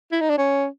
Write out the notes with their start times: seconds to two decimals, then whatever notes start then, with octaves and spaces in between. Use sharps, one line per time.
0.12 E4
0.20 D#4
0.30 D4
0.38 C#4